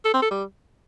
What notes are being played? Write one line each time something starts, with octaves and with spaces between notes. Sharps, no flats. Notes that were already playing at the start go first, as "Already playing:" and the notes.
A4
C4
A4
G3